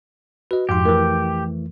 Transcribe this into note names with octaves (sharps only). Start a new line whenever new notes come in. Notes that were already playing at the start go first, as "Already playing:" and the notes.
F#4 B4 D#5
F2 G#2 F3 G4 C6
E3 A3 A#4